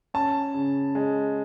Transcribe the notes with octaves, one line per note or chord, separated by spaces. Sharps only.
C#4 A5
C#3
G#3